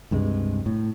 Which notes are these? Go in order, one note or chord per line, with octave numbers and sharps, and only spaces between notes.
C#2 G2 C3 G#3
A2